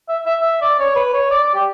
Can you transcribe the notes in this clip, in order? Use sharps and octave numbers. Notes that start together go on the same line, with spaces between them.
E5
E5
E5
D5
C#5
B4
C#5
D5
D5
G4